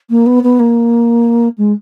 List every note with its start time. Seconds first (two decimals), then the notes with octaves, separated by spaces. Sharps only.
0.10 A#3
0.26 B3
0.43 B3
0.59 A#3
1.58 G#3